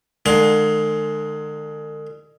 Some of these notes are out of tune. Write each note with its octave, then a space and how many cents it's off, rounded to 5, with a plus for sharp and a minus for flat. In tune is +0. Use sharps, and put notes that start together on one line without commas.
D3 +45 G#3 +15 F5 +40